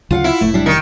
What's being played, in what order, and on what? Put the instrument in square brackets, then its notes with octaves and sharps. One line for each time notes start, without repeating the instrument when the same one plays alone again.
[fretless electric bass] D2 C#3 F#3 [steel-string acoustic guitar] F4 F5 F#5
[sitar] E4
[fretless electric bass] F1 A2 [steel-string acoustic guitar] A3
[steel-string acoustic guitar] G3 D4
[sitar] D#3